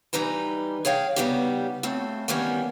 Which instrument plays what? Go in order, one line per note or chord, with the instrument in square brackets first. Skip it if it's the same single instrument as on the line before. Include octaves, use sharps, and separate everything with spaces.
[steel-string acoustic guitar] E3 G3 D#4 B4 A#5
G#4 C#5 F5 G5
C#3 G3 A#3 B3 D#4 G4
C#3 A3 C4 A4
D#3 E3 G3 A#3 B3 C#4